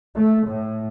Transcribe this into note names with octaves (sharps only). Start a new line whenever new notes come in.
A3
A2